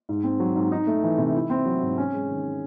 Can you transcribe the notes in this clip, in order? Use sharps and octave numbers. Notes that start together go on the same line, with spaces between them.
G#2
C4
F#3
G#2
D#4
A3
E3
C3
E4
C4
F#3
G#2
C#4
G#3
D#3